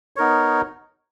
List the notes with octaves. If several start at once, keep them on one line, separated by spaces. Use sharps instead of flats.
B3 D#4 A#4 C#5